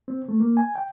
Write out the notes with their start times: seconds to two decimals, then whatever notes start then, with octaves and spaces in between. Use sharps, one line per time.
0.08 C4
0.29 A3
0.40 A#3
0.57 G#5
0.76 G5